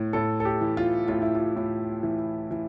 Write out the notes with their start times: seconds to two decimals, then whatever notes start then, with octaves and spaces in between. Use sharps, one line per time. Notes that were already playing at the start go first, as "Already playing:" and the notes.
Already playing: A2
0.13 A2 A4
0.40 A4
0.45 G4
0.61 E3
0.77 F4
1.08 A2 F4
1.22 E4
1.35 F4
1.56 A2
2.03 E3
2.51 E3